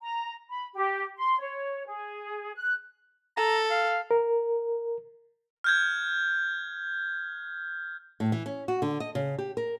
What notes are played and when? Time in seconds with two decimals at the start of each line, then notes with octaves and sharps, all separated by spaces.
0.01 A#5
0.49 B5
0.75 G4
1.17 C6
1.39 C#5
1.86 G#4
2.55 F#6
3.37 A4 A#5
3.70 F5
4.11 A#4
5.64 F6 G6 G#6
8.20 A2
8.32 E3
8.46 C#4
8.68 F#4
8.82 D3
9.00 D#5
9.15 C#3
9.38 G4
9.57 A#4